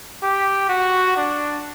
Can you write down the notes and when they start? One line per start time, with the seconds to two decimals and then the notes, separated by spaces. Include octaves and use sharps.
0.22 G4
0.69 F#4
1.17 D4